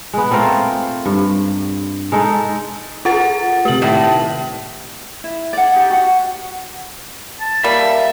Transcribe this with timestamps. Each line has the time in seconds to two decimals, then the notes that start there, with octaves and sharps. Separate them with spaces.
0.13 G#3 B3
0.31 A3 C4 F4 A#4
1.06 G2
2.12 G#3 D#4 A4
3.05 F4 G#4 A#4 B4 F#5 A6
3.65 C3 A3 G4 F#7
3.82 A2 C3 D#3 E7
5.24 E4
5.53 D5 F#5
5.73 D#4 G4
5.90 F#4 F#5
7.41 A5
7.64 G3 A#3 E5